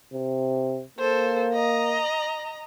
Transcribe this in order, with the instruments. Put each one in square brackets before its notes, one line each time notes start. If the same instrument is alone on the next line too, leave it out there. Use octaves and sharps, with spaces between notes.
[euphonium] C3
[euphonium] A#3 [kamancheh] A4 C5
[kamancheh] D#5 A#5